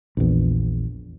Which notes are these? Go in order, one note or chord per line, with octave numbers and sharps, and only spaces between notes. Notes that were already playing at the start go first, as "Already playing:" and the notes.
A#1 E2